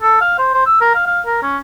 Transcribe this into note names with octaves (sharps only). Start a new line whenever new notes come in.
A4
F5
C5
C5
E6
A#4
F5
F5
A#4
C#4